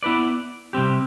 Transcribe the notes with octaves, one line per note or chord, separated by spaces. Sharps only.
B3 E4 B4 D5
C3 G3 C4 G4